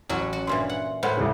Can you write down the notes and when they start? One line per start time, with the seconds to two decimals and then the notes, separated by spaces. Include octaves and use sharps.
0.09 A1 F#3 C#4 F#4
0.33 F#4
0.47 G2 A#2 E3 C6
0.69 F#5
1.03 A2 B4 C5 F#5
1.17 C2 C#3